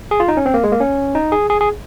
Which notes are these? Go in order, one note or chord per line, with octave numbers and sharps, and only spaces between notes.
G#4
F4
D#4
C#4
C4
A#3
G#3
A#3
C#4
D#4
G#4
G#4
G#4